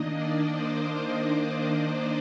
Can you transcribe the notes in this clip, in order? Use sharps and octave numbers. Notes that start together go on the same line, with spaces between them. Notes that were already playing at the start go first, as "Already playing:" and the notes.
Already playing: D#3 A#3 D4 D#5
D5
C5